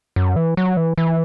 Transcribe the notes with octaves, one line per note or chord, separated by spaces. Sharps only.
F#2
E3
F#3
E3
E3